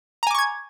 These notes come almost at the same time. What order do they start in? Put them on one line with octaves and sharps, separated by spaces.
A#5 G#5 D6 C#6 G#6